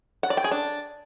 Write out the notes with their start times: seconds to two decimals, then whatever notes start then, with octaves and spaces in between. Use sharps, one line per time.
0.23 F#5
0.30 D5
0.37 G5
0.44 G#4
0.51 D4